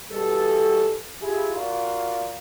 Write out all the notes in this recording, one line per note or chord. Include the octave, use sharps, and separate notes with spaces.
B2 E3 G3 A4
E4 F4 G4 G#4
F4 F#4 A#4 D5 F5